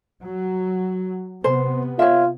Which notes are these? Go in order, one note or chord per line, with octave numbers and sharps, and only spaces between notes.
F#3
C3 B3 C5
F4 C#5 E5